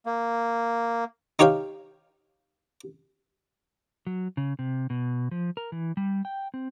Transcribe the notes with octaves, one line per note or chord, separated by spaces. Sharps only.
A#3
D#4 G4 C#5 F5 G5
F#3
C#3
C3
B2
F3
A#4
E3
G3
G5
C4